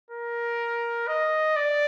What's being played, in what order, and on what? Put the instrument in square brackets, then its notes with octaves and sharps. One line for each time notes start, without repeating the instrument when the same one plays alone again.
[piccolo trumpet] A#4
D#5
D5